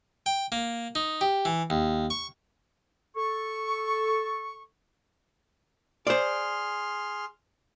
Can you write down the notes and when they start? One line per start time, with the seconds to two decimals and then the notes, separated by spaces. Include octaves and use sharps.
0.26 G5
0.52 A#3
0.95 D#4
1.21 G4
1.45 E3
1.70 D#2
2.10 C#6
3.17 A4 C#6
6.07 G#4 C5 D5 C6 F6